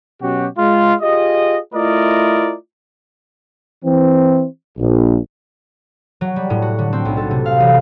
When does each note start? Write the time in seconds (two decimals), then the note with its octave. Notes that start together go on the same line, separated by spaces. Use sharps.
0.21 B2 F#3 C#4 F#4 G4
0.58 G#3 F4
1.01 F4 G4 G#4 D#5
1.74 A3 E4 F4 A#4 D5 D#5
3.84 E3 C4
4.78 A#1
6.21 F#3
6.36 G3
6.50 A2
6.62 F#4
6.79 D3
6.93 C4
7.05 B1
7.17 A4
7.31 C3
7.46 F5
7.60 A1